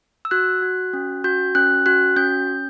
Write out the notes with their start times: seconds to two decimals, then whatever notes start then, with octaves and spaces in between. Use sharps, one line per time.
0.25 E6
0.31 F#4 F#6
0.62 F#4
0.93 C#4
1.24 F#4 G6
1.55 C#4 F#6
1.86 F#4 F#6
2.16 C#4 G6
2.47 C#4